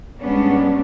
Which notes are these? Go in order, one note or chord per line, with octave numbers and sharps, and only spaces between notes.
G#2 G3 G#3 B3 C#4 D4